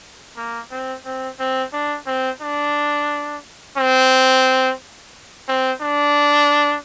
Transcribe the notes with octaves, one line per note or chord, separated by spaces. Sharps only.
A#3
C4
C4
C4
D4
C4
D4
C4
C4
D4